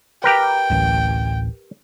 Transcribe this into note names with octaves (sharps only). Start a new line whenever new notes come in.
G4 A#4 B4 G5
D1 A1